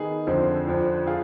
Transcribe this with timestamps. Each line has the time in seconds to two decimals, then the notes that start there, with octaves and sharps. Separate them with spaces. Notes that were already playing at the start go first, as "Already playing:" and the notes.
Already playing: D#3 B3 D#4 G#4
0.27 F2 D3 F3 C4
0.67 F2 D3 F3
1.06 F4 G#4